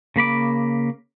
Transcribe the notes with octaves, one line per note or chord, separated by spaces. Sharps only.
C#3 A#3 B5 D6